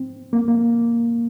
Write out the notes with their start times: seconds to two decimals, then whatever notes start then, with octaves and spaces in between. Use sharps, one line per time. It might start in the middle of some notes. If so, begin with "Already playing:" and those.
Already playing: C4
0.33 A#3
0.48 A#3